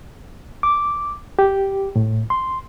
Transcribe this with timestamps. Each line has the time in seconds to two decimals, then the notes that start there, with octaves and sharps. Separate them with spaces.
0.63 D6
1.39 G4
1.96 A2
2.30 C6